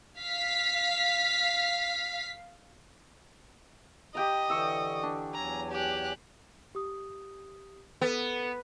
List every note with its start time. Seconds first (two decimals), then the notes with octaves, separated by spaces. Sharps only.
0.19 F5 B6
4.15 G4 D#5 G5 A#5
4.50 D3 E3 G5 C#6 E6
5.03 D4
5.34 E2 F#3 G#5 A#5
5.71 G4 F#6
6.75 G4 D#6
8.01 B3 A4 B4